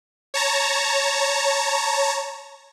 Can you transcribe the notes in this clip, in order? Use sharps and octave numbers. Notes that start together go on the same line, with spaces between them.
C#5 A5 A#5